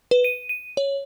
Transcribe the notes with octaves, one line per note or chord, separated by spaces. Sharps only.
B4
D#7
D#7
C#5